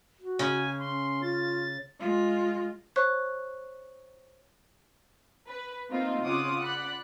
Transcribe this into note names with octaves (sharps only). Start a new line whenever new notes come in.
F#4
C#3 G#5
C#4 C6
F4 A6
G#3 F4
C5 C#5 C#6 F#6
B4
A#3 C4 D#4 F4
C#3 F4 C#5 F#5 D6 D#6
D5 F#5 B5 F#6